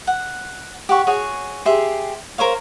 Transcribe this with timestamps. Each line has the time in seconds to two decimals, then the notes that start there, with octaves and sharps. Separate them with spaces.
0.07 F#5
0.89 G4 F#5 C#6
1.07 F#4 G#4 C#5
1.65 G4 G#4 E5 C6
2.38 A#4 C5 C#5 F5